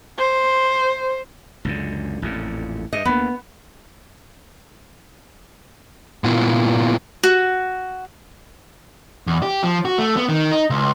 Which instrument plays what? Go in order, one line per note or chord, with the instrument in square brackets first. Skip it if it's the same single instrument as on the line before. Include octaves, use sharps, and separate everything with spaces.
[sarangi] C5
[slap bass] C#2 F#2 D3
A1 F2 A#2
[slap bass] G2 [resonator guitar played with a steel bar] D#5
[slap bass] D2 A#3 [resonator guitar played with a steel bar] B3
[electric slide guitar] A#2 B3 E4 F4
[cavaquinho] F#4
[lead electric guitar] E2
G4
F3
F#4
A3
B3
D#3
D#4
C#2